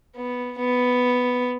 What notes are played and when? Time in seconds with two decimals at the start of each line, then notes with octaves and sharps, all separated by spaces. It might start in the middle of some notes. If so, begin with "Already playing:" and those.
0.16 B3
0.58 B3